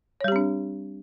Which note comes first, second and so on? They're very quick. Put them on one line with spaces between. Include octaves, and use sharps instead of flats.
C#5 G3 G4 C4 D4